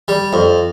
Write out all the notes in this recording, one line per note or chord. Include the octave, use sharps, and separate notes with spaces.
G3
F2